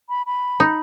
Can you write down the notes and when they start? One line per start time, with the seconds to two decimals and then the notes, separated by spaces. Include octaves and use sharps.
0.09 B5
0.26 B5
0.60 D#4